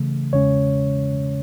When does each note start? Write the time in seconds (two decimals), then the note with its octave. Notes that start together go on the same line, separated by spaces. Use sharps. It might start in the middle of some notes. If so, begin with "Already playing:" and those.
Already playing: C#3 E3 A3
0.33 E2 C#3 G#3 C#4 C#5